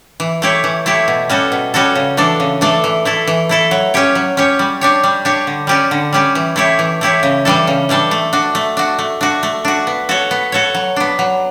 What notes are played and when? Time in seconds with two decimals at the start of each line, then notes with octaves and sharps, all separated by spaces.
0.20 E3
0.42 A3 E4 G4 C#5
0.64 E3
0.86 A3 E4 G4 C#5
1.08 B2
1.29 G3 C#4 F#4 A4
1.52 B2
1.74 G3 C#4 F#4 A4
1.95 C#3
2.17 E3 A3 D4 A4
2.40 C#3
2.61 E3 A3 D4 A4
2.84 E3
3.05 A3 E4 A4
3.27 E3
3.49 A3 E4 A4
3.71 F#3
3.94 C#4 G4 C#5
4.15 F#3
4.37 C#4 G4 C#5
4.59 G3
4.81 D4 G4 C#5
5.04 G3
5.25 D4 G4 C#5
5.47 D3
5.67 G3 C#4 G4 D5
5.91 D3
6.13 G3 C#4 G4 D5
6.35 E3
6.56 A3 E4 G4 C#5
6.79 E3
7.01 A3 E4 G4 C#5
7.23 C#3
7.45 E3 G3 D4 A4
7.67 C#3
7.89 E3 G3 D4 A4
8.11 A3
8.33 D4 F#4
8.55 A3
8.77 D4 F#4
8.99 A3
9.21 D4 F#4
9.43 A3
9.65 D4 F#4
9.87 B3
10.09 F#4 A4 C#5
10.31 B3
10.52 F#4 A4 C#5
10.74 F#3
10.96 B3 D4
11.19 F#3